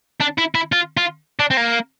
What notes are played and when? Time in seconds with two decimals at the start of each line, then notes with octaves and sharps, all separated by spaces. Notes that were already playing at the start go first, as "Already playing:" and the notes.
0.21 D4
0.38 E4
0.55 E4
0.72 F4
0.97 F4
1.40 D4
1.51 C4
1.57 A#3